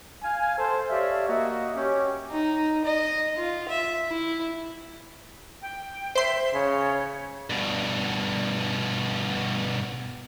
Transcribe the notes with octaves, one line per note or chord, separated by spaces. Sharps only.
F5 G#5
A4 C5
G4 C#5 D5 E5 F5
A#3 F#4 D#5 E5
C#4 G4
D#4
D#5
F4
E5
E4
G5
C5 E5 C6
C#3 C#5
G2 B2